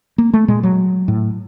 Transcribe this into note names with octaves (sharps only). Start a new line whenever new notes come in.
A#3
A3
A#2 G#3
F#3
A2